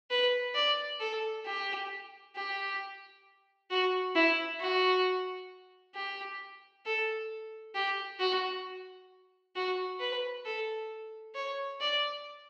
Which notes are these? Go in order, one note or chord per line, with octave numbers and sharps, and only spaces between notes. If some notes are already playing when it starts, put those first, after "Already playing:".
B4
D5
A4
G4
G4
F#4
E4
F#4
G4
A4
G4
F#4
F#4
B4
A4
C#5
D5